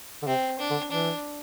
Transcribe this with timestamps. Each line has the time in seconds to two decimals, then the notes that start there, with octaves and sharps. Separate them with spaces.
0.22 D3
0.27 C3 C4
0.60 D4
0.70 D3
0.91 E3 D4